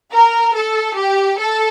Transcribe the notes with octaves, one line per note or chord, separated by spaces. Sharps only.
A#4
A4
G4
A4